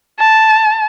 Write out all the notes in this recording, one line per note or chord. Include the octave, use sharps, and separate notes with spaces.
A5